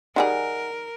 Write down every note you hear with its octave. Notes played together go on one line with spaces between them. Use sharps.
D#3 G3 D#4 G#4 A#4 F#5 G#5